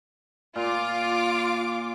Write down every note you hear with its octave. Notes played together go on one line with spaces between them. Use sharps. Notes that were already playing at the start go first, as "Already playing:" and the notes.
A#2 F4 D6